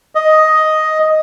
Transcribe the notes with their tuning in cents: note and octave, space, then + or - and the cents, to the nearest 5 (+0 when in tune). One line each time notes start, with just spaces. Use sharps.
D#5 +5